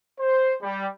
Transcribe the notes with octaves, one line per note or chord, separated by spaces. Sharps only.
C5
G3